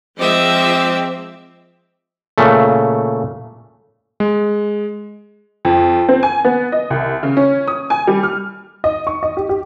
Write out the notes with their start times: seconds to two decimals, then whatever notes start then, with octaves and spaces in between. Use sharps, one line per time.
0.20 F3 G#3 C4 D#5 E5 D6
2.38 A#2 C#3 A3
4.20 G#3
5.65 F2
6.09 C4
6.23 G#5
6.45 B3
6.72 D#5
6.90 C2
7.23 C#3
7.37 C#4
7.68 D#6
7.90 G#5
8.07 G3
8.23 F6
8.84 D#5
9.07 C#6
9.23 D#5
9.37 G4
9.49 G4